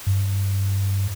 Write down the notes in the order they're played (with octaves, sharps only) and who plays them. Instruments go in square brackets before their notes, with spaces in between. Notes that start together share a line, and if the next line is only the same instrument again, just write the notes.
[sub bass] G2